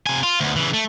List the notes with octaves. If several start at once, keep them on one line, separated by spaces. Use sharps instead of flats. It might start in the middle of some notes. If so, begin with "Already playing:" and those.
C3 G#5
F4
D2 B3
C#3 E3
A3